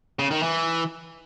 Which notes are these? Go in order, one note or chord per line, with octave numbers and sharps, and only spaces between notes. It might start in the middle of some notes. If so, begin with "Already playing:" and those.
C#3
D#3
E3